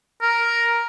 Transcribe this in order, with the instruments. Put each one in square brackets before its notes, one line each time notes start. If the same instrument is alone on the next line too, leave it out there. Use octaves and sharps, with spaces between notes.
[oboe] A#4